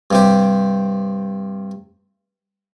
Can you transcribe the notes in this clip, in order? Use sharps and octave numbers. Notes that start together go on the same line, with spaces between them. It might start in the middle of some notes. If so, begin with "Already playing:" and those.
G2 C3 G4